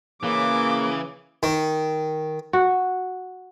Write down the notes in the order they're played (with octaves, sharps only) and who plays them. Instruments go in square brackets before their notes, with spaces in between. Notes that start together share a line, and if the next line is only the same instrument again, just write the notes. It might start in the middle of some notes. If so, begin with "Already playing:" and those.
[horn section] C#3 [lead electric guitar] E3 [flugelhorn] A#3 [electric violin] D6
[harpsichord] D#3
[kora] F#4